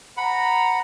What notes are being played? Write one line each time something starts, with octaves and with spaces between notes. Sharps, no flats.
C5 F#5 A#5 B5